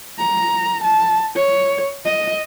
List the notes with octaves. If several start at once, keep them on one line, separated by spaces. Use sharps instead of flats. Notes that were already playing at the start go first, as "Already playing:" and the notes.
A#5
A5
C#5
D#5